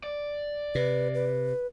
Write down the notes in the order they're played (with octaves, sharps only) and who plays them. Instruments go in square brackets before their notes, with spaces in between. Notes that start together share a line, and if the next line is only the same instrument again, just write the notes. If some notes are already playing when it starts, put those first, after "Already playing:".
[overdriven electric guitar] D5
[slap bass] C3 [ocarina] B4
[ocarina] B4